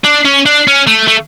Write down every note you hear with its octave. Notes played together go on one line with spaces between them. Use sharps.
D4
C#4
D4
C#4
A3
A3